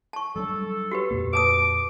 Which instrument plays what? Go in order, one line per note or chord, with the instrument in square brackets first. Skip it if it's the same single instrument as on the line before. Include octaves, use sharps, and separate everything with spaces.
[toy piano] A5 C#6
[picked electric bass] F#3 G3 D4 [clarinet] A4
[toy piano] F#4 G4 B4
[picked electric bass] F2 A#2 A#3
[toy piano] B4 A5 D#6 [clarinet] D6